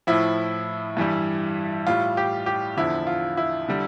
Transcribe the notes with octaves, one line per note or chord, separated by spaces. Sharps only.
A2 F3 E4
G2 E3 G3
A2 G3 F4
G4
G4
E2 D3 F3 E4
F4
E4
D3 G3